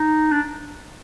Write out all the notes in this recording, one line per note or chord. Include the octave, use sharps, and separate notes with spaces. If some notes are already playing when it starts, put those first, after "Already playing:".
Already playing: D#4
D4